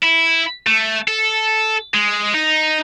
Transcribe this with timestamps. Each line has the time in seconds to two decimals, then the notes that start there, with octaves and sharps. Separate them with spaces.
0.03 E4
0.67 A3
1.08 A4
1.94 G#3
2.34 D#4